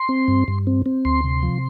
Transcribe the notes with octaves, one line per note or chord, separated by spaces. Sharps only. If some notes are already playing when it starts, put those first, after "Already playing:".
Already playing: C6
C4
G2
G2
C4
C4
D2 C6
C3
F3